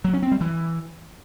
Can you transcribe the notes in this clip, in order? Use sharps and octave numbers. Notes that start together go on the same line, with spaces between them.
F#3
C#4
C4
G3
E3